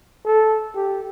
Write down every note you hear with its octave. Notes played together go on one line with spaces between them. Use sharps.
A4
G4